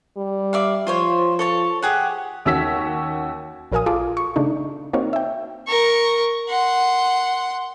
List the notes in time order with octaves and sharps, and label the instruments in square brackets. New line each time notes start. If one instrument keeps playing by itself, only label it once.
[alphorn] G3
[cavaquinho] D5 E5 F5
[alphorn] F3 [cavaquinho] F4 C5 C#5
[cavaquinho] A4 C#5 A5
G4 G#4 F#5
[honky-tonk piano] D#2 C#4 F#4 E6 B6
[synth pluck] A#1 F#3 A#4 F5 G#5 D#6
F4 G#4 A4 D6
C#6
C#3 A3 D4 D#4
A#3 C4 D#4 F#4 C#5 F5
E5 G5
[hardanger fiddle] A#4 C#6
F#5 C6